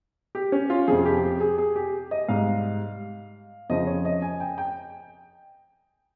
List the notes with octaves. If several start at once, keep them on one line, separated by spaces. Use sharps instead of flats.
G4
C#4
F4
F2 C3 F3 G#4
G#4
G4
G4
G#4
G#4
G4
D#5
G#2 G3 F5
F2 C#3 F3 D#5
C#5
D#5
G#5
G5
G5